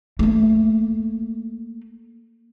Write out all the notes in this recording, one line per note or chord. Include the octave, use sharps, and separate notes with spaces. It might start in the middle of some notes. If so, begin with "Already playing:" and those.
A3 A#3